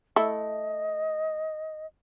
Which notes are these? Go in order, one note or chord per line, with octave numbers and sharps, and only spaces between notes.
A3 E4 D#5